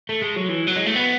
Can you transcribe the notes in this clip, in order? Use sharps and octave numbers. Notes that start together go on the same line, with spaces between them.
A3
G#3
F#3
E3
F#3
G#3
A3
B3